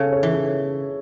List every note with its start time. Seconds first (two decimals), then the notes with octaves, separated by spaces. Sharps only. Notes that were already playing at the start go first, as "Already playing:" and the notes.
Already playing: C#3 A4
0.13 C#5
0.23 E3
0.33 A4